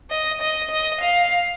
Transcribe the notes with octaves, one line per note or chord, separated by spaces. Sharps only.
D#5
D#5
D#5
F5